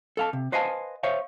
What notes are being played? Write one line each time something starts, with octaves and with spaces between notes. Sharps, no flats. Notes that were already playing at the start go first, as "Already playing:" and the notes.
A4 F5 A5
C3
B4 C5 D#5 F5 G#5 A5
C5 C#5 E5 F5